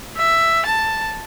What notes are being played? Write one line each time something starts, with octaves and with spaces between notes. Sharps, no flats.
E5
A5